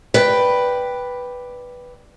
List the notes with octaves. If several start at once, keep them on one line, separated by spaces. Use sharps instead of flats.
B4 D5 G5